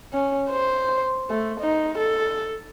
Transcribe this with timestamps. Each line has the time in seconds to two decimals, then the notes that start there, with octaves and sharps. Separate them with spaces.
0.13 C#4
0.50 C5
1.29 A3
1.60 D#4
1.98 A4